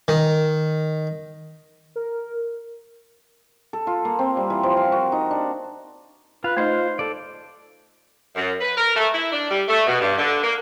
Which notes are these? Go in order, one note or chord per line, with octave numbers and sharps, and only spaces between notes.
D#3
A#4
A4
F4
A#3
C4
G3
E3
F3
F5
F#4
D#4
D4
F4 B4 F5
A3 D#4 C5 D#5
A4 D5
F#2
B4
A#4
A3
E4
D4
G3
A3
B2
G2
D3
A#3